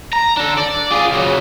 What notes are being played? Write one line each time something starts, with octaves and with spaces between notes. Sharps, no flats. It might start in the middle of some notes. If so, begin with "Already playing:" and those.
A#5
D4 A4
D5
F4 G#4
C#3 F#3